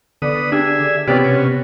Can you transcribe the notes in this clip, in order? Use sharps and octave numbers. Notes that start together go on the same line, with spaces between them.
D3 B3 D5 D#6
D4 G4 G#4 E5
C3 B3 C4 F4 G4 B4 C#5 D5
B2 C#4